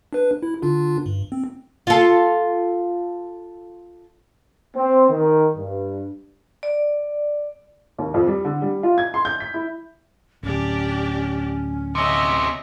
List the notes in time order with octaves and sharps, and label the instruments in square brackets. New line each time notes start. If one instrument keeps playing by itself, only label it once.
[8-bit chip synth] D4 B4
E4
D3 D4 F4
G2
C4
[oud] F4 A4
[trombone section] C4
D#3
G2
[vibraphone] D5
[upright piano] D#2
F2
G3
D3
G3
F4
G#6
C6
G6
B6
E4
[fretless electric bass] D1 G#1 [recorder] C#4 [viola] D4 G4
[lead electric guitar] C3 C#4 [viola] D#5 E5